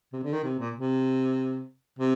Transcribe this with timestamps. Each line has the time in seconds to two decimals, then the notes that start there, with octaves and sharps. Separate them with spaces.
0.13 C3
0.24 D3
0.33 D#3
0.44 C3
0.59 A#2
0.75 C3
1.99 C3